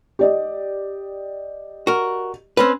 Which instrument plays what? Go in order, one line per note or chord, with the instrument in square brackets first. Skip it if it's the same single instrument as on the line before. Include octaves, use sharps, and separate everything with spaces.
[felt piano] G4 D5 D#5
[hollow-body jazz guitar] F#4 A#4
C4 C#4 B4